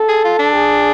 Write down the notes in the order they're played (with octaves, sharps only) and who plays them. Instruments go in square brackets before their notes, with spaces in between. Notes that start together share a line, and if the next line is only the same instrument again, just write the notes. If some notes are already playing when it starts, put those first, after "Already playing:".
Already playing: [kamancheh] A4
[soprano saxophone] G#4
F4
D4
[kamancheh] G#4